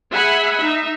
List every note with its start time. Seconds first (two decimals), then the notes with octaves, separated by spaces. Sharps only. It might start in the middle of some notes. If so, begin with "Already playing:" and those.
0.11 G#4 E5 F#5 G#5 B5
0.57 D#4 E5